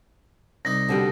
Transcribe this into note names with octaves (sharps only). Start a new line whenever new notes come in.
C2 D#4 D#5 A#6
B2 D3 G3